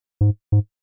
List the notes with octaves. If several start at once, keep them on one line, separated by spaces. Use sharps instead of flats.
G#2
G#2